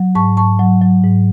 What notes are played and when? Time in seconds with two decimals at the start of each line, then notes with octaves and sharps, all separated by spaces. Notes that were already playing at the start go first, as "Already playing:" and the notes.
Already playing: F#3
0.15 G#2 A5 C#6
0.37 G#2 A5 C#6
0.60 F#3
0.82 F#3
1.03 G#2